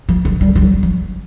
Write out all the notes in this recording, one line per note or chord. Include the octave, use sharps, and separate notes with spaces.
F3
D3
G3
F3
G3
F3